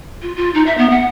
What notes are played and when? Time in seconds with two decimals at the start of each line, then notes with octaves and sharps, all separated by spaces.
0.22 F4
0.36 F4
0.54 D#4
0.66 E5
0.78 B3
0.90 F#5